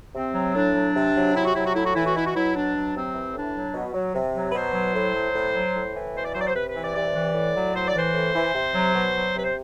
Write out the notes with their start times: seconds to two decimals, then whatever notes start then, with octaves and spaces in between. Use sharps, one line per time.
0.14 C3 C4
0.34 F#3
0.55 A2 D4
0.74 F#3
0.95 C3
1.15 F#3
1.34 C3 E4
1.44 F#4
1.54 F#3 E4
1.64 F#4
1.74 A2 E4
1.84 F#4
1.94 E3 E4
2.05 F#4
2.14 B2 E4
2.25 F#4
2.34 F#3 E4
2.54 B2 D4
2.75 F#3
2.94 C3 C4
3.14 E3
3.34 A2 D4
3.54 F#3
3.74 B2
3.94 F#3
4.15 C3
4.34 F#3
4.50 B4
4.55 B2 C5
4.74 F#3
4.94 A2
5.14 F#3
5.34 A2
5.55 F#3
5.74 A2
5.94 E3
6.14 B2 C5
6.23 D5
6.32 F#3 C5
6.40 D5
6.47 C5
6.54 C3 B4
6.67 B4
6.75 E3
6.81 D5
6.94 C3 D5
7.14 E3
7.34 A2
7.54 F#3
7.74 A2 C5
7.86 D5
7.94 E3 C5
8.14 A2
8.34 E3
8.54 C3
8.75 F#3
8.94 B2
9.14 F#3
9.34 C3 B4
9.43 C5